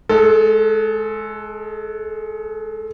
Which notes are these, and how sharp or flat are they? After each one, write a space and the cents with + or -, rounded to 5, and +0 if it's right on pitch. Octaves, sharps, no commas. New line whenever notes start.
G#3 +30 A4 +0